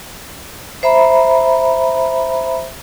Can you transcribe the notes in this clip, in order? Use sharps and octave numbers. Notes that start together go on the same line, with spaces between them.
C5 E5 A#5 B5